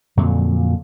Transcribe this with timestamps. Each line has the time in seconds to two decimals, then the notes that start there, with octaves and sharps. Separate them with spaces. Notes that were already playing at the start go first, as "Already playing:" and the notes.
0.17 F2 A#2 D3 F#3